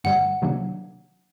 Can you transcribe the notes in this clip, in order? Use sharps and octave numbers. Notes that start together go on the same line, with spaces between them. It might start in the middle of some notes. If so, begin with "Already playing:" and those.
G2 D3 G3 F#5
C3 D#3 F#3 A#3 D4